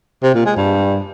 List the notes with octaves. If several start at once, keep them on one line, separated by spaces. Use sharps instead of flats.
C3
A#2
G#3
G2